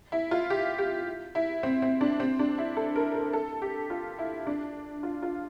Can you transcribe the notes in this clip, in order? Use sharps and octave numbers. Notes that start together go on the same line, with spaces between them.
E4
F4
G4
G4
E4
C4
C4
D4
C4
D4
E4
A4
A#4
A#4
A4
G4
F4
E4
D4
F4
F4